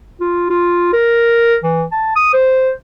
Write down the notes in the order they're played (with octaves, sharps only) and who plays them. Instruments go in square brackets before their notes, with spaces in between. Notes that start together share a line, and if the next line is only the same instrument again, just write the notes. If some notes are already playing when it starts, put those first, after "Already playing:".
[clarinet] F4
F4
A#4
E3
A5
D#6
C5